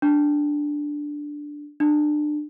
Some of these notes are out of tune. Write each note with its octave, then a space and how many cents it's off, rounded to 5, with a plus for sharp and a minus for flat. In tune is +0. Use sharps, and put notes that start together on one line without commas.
D4 +0
D4 +30